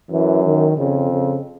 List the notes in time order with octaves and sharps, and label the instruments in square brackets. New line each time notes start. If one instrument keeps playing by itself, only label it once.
[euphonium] F#2 [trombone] E3
[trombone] D#3
[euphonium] F2 [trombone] C#3
[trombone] C#3